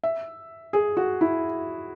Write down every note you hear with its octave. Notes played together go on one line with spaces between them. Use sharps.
E5
G#4
F#4
E4